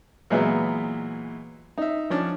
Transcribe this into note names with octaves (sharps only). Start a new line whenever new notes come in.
A#2 E3 F#3 G#3 B3 E4
D#4 E5
F3 C#4 D4